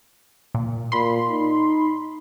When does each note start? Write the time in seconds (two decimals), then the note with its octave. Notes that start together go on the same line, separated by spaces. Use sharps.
0.55 A#2
0.92 A#2 B5 C6
1.30 D#4